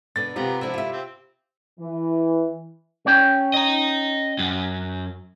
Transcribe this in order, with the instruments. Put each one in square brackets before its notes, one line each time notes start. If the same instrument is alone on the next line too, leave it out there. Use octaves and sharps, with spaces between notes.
[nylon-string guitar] B2 D3 [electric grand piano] A6
[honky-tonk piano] C3 [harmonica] B3 A#5 [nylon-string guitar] F4 G4
[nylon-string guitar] D3 F3 F#4 [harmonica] E4
[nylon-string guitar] F4 E5
[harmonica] C4
[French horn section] E3
[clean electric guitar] C#4 C#5 G5
[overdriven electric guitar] D#5 A#5
F#2